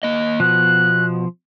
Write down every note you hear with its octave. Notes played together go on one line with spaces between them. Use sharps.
A#3 D#5
B2 F3 F#6